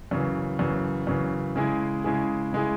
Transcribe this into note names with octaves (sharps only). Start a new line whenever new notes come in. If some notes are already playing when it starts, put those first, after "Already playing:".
F#2 C#3 E3
F#2 C#3 E3
F#2 C#3 E3
C#3 G#3 E4 G#4
C#3 G#3 E4 G#4
C#3 G#3 E4 G#4